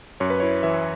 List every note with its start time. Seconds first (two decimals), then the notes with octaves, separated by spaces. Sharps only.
0.20 F#2 C#5
0.30 B4
0.40 C#5
0.43 E4
0.63 E3 E5